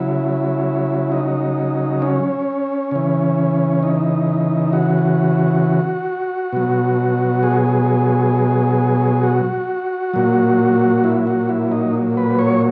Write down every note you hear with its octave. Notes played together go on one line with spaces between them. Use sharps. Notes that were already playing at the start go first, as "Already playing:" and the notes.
Already playing: C#3 F#3 E4
D#4
C#4
C#3 E3
D#4
F#4
B2 F#3
G#4
F#4
A#2 F#3
E4
F#4
E4
D#4
B4
C#5